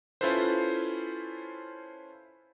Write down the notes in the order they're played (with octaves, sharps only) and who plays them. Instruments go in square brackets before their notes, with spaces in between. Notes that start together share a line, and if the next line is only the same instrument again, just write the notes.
[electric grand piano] C#4 E4 F4 A4 B4 C5